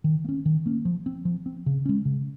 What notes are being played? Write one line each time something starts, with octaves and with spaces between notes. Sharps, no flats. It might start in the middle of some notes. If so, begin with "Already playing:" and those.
D#3
A#3
C#4
D#3
A#3 C#4
F3
C4
F3
C4
C#3
G#3 C#4
C#3